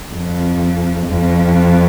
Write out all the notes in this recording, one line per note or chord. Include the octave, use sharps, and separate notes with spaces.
F2
F2